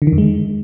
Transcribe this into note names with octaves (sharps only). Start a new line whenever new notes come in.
D3
D#3
F2
G#3